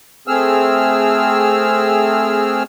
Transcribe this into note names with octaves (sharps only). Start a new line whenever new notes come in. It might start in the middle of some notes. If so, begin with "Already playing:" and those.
A3 C4 G#4 E6 F6